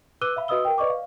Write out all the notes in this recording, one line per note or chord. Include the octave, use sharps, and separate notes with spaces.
B4 D6 E6 F#6 D#7 G7
E5 F5 B5
F#4 B4 D#5 D#6 E6 G7
A#4 G5
B4 D5 D#5 C#6 D6
F5